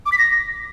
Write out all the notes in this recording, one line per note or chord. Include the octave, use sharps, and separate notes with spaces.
D6
B6
A#6